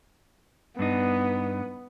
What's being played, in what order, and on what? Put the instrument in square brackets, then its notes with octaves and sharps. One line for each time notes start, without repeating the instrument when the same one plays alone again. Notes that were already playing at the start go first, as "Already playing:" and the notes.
[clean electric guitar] G2 D4 D#4 [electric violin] B3